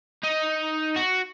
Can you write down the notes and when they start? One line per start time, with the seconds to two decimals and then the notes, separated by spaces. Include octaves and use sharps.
0.23 D#4
0.96 F#4